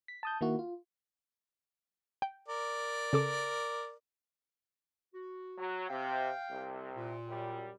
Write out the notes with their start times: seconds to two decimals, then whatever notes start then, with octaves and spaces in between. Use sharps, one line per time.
0.08 B6
0.23 A5 D#6 G6
0.41 D#3 A#3 E4 F#4
0.59 F4
2.22 G5
2.48 A#4 D5
3.13 C#3 A4 D6
5.14 F#4
5.58 F#3
5.89 C3 F5 G5
6.51 C2 C3
6.95 A#2
7.28 F#2 G3